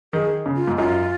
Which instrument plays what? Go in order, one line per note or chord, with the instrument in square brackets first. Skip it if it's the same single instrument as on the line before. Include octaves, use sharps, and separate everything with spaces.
[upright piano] D#3 [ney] G#4
[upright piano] C#3
[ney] F4
[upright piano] G#2
[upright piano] F#2 [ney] F4